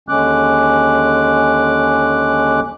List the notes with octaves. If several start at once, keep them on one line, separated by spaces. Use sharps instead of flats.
D#2 D3 G#3 C#4 D6 F#6